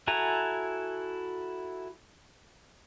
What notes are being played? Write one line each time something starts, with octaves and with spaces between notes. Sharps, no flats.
E4 F#4 A4 G#5 A#5